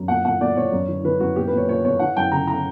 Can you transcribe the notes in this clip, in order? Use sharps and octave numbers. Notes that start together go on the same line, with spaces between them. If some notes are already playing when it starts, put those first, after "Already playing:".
Already playing: F#2
A#2 F#5
A#2 F#5
A#2 D5
A#2 C#5
F#2
E3
E3 B4
F#2 F#4
A#2 G4
B4
A#2 C#5
A#2 C#5
A#2 C#5
E3 F#5
F#2 G5
C#3 A#5
A#5